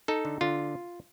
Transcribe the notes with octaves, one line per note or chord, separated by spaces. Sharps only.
D#4 A4
D3
D3 F4